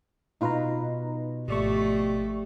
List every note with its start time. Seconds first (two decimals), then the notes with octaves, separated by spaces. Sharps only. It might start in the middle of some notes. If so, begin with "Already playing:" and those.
0.41 B2 D#4 F4 B4 A#5
1.48 G#1 F3 A3 G4 D5 C#6